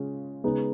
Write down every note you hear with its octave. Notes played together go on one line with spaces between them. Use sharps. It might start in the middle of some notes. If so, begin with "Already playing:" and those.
Already playing: C#3 G#3 C#4 F4
C#3 G#3 B3 D#4